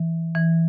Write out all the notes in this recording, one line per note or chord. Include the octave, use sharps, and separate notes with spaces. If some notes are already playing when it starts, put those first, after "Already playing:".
Already playing: E3
E3